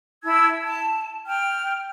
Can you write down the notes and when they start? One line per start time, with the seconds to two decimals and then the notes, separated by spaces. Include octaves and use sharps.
0.23 E4 A5 E6 G#6
0.59 A5
1.27 G5 F6